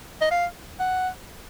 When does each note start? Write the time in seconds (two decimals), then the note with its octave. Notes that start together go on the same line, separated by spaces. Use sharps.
0.21 D#5
0.31 F5
0.80 F#5